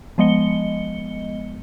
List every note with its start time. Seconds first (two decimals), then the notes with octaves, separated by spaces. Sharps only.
0.18 F3 G#3 B3 D#5 C#7 G7